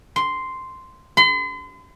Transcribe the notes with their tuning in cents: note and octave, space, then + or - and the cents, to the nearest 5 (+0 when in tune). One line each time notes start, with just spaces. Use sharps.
C6 -5
C6 -45